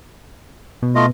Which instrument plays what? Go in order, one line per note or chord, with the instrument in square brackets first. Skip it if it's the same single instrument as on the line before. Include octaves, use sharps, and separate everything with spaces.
[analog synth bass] B2
[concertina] A3 F4 D#5